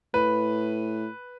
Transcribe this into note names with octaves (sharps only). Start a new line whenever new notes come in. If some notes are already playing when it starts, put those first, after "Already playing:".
A2 B4